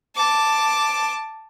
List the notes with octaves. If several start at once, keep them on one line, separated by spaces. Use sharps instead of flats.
A5 D6